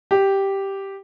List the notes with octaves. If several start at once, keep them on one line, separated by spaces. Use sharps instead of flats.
G4